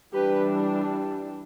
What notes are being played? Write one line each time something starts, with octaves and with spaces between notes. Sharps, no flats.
E3 G3 D4 G4 B4